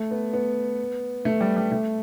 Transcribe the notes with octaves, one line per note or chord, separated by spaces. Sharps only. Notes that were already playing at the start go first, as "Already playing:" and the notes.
Already playing: A3
B3
B3
A3
G3
G3
A3